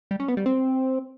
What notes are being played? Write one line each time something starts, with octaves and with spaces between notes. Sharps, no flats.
G3
C#4
B3
G3
C4